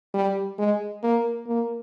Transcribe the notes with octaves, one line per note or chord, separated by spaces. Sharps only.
G3
G#3
A#3
A#3